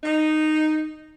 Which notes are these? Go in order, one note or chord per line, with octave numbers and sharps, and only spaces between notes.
D#4